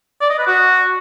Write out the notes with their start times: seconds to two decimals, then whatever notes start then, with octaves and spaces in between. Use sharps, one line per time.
0.21 D5
0.30 D#5
0.38 B4
0.47 F#4